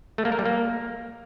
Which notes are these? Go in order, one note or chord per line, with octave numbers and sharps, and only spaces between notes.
A3
A#3
A#4
G3
A#3